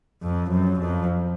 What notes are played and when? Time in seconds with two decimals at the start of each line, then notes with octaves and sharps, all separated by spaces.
0.23 F2
0.51 F#2
0.80 F2